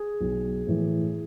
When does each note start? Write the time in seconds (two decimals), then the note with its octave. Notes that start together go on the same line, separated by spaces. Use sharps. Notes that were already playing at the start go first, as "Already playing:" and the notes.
Already playing: G#4
0.21 B1
0.67 A2 E3